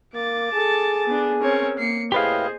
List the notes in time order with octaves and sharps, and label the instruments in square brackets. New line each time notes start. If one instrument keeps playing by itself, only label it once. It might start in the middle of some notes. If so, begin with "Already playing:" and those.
[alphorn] A#3 [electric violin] D6 A6
[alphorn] G#4 [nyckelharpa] A4 A5
[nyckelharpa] B3 D4
[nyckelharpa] C4 C#5 [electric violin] C#4 A#4
[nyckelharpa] A#3 [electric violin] C7 C#7
[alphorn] A2 [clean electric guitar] G4 B4 F5 [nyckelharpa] G#4 C5 [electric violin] D#5